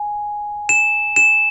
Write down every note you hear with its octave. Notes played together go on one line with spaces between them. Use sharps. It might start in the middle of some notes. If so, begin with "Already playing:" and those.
Already playing: G#5
E7
E7